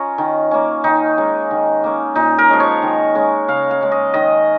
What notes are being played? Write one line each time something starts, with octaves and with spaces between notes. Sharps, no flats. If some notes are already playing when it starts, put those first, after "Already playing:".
Already playing: C#4 F4 A#4 C#5 D#5
D#3
A#3 C#4
D#3 D#4
G#3 C#4
D#3
A#3 C#4
A#2 D#4
A#4
F3 G#3 C#4
C#5
D#3
G#3 C#4
C#3 F5
F5
G#3 C#4
D#5
D#3 D#5